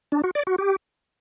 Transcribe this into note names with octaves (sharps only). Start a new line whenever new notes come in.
D4
F#4
D5
F#4
G4